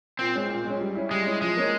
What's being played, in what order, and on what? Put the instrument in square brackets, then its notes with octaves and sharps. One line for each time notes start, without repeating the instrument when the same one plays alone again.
[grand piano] A#2 [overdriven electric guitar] C4
[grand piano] G#3 C#4
A#2
G#3 C#4
G3
C#4 E4
[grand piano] G3 [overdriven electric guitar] G#3
[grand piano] C#4 E4
[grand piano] F3 [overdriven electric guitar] G#3
[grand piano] A#3 C#4